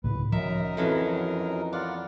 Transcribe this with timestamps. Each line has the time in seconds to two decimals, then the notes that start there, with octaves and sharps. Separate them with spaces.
0.04 C#2 A2 B4
0.32 F#2 F3 D#4 A#4 E5
0.77 F2 E3 F#3
1.73 B3 F4 D5 F#5